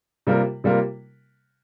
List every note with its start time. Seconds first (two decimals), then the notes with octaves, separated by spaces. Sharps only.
0.27 C3 G3 A#3 F4 A#4
0.64 C3 G3 A#3 F4 A#4